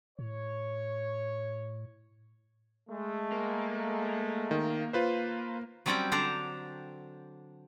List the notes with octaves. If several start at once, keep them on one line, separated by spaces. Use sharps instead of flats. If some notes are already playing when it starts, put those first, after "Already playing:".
A2 C#5
G#3 A3
A#3
D#3
F4 B4 C5
F#3 G3 C4 C#4 D5 G5
D3 D4 A4 C5 D5 A#5